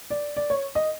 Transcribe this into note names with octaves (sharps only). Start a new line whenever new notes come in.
D5
D5
C#5
D#5